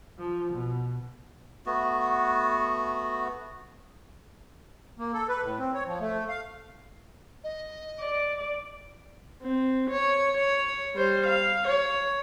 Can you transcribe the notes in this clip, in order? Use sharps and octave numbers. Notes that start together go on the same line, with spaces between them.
F3
B2
A3 B3 F#4
A#3
A4
B4
A2
C4
C#5
F3
A3
F5
D#5
D5
C4
C#5
C#5
G3 C5
F5
C#5